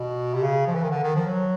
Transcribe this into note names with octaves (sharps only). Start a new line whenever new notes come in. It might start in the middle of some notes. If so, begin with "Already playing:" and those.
Already playing: B2
C3
C#3
F3
E3
D#3
D3
D#3
F3
F#3